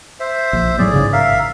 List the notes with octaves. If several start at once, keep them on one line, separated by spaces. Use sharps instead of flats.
C5 E5
A#1
A2 F#3 B3 G#4 D5
A1 G#2 C#3
A#4 E5 F5